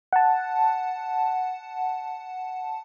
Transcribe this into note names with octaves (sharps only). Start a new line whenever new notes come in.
F#5 A5